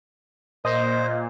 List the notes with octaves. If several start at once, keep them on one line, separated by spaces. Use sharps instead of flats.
A#2 C5 D#5